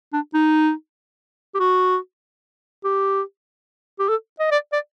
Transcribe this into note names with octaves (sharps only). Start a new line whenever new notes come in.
D4
D#4
G4
F#4
G4
G4
A4
D#5
D5
D5